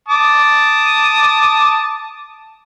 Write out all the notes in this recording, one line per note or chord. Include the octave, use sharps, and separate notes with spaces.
A5 D6 D#6